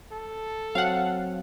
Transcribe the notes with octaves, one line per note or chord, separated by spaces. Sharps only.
A4
F#3 C4 F5 F#5